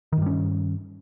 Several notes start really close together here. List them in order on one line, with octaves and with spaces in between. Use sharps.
D#3 G2 G3 C#4